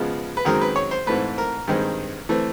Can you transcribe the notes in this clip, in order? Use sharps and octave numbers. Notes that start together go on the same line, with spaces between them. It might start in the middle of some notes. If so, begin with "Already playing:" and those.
Already playing: C#3 F3 G#3 B3
B4
F#2 D#3 G#3 C4 A#4
B4
C#5
C5
G#2 E3 A3 C4 B4
A#4
G2 D#3 G#3 C4
E3 A3 C4